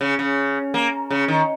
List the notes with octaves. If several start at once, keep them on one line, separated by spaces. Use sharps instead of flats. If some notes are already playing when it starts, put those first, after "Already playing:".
C#3
C#3
A#3
C#3
D#3